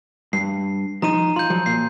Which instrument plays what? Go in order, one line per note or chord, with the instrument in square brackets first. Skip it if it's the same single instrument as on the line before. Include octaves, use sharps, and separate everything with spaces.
[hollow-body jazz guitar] G2 [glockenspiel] C7
[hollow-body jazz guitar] F3 D#4 [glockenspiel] A#5 D#7
[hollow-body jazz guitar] F4 [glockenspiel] C6 G6
[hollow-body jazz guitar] F3 F#3
[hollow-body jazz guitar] A#2 [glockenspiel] C7